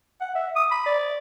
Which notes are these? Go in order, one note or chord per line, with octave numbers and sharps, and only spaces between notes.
F#5
E5
D#6
B5
D5